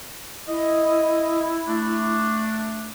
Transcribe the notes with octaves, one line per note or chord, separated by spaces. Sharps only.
E4 D#5
A3 D4